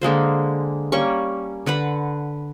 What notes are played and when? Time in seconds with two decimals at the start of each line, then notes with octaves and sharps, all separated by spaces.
0.01 D3 G#3 A#3 C5
0.92 G3 A#3 C#4 C#6
1.66 D3 B4 F#5 B5